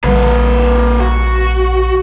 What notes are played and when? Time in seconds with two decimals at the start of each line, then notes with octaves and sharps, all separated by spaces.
0.04 A#1 D3 G3 A#3 B4
1.00 F#4